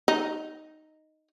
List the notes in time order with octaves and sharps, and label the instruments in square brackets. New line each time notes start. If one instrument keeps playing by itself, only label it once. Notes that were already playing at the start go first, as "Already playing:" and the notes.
[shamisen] D#4